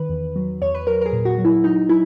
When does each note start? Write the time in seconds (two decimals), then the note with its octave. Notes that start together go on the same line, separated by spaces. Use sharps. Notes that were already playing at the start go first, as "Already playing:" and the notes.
Already playing: D#3 B4
0.09 E2
0.36 F#3
0.62 E2 C#5
0.74 B4
0.87 F#3 A#4
1.01 A#4
1.06 G#4
1.13 A#2
1.25 F#4
1.38 F#3
1.45 E4
1.64 F#3 D#4
1.89 F#3 E4